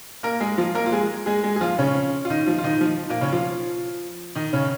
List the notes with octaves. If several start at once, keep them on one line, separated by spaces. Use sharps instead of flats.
A#3 A#4
G#3 G#4
F3 F4
A#3 A#4
F4
G#3 G#4
G#3 G#4
G#3 G#4
G#4
F3 F4
C#3 C#4
F4
D#3 D#4
F3 F4
F4
D#3 D#4
F3
A#2 A#3
C#3 C#4
F3 F4
D#3 D#4
C#3 C#4